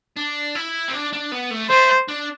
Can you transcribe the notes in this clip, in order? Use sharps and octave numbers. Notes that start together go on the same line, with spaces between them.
D4
E4
C4
D4
D4
B3
A3
A3 C5
D4